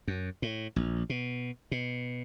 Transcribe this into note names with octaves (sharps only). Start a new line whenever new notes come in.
F#2
A2
A#1
B2
B2